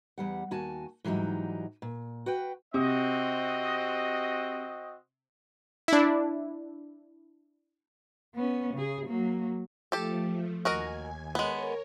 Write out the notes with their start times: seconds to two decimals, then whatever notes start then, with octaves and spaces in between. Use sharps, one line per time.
0.18 E2 G3 F#5
0.51 D#2 F#4 G#5 A5
1.04 G#2 E3 F#3 G3 D#4
1.82 A#2
2.26 F#4 B4 G5
2.74 C3 C4 F#4 D#5
5.88 D4 E4
8.35 B3 C#4
8.74 C#3 G#4
9.06 F#3 A#3
9.92 F3 A3 G4 A4
10.65 D#2 F#4 A#4 D#5 G#5
11.35 G#3 B3 A#4 C#5